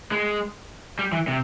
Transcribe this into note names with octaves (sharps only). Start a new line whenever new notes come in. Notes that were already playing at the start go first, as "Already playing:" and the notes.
G#3
G3
E3
C3